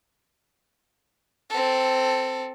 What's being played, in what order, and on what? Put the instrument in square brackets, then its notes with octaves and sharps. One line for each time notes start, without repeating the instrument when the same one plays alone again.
[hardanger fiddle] C4 A4